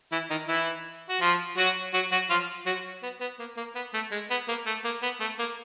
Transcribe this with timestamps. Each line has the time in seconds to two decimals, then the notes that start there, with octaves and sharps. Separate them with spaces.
0.12 E3 E4
0.30 D#3 D#4
0.48 E3 E4
1.09 F#4
1.21 F3 F4
1.57 F#3 F#4
1.94 F#3 F#4
2.12 F#3 F#4
2.30 F3 F4
2.66 F#3 F#4
3.03 B3
3.21 B3
3.39 A#3
3.57 A#3
3.75 B3
3.94 A3
4.12 G#3
4.30 B3
4.48 A#3
4.67 A3
4.84 A#3
5.03 B3
5.21 A3
5.39 A#3